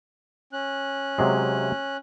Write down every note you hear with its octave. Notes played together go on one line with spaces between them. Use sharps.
C#4 F#6
C3 F#3 G#3